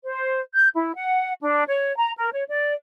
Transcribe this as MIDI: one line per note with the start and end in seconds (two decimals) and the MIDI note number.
0.04 0.40 72
0.55 0.68 91
0.75 0.92 64
0.95 1.33 78
1.41 1.64 62
1.68 1.96 73
1.96 2.12 82
2.17 2.29 70
2.32 2.44 73
2.49 2.73 74